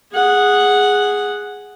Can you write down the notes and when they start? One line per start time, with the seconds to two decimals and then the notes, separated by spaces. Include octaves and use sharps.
0.13 G#4 F#5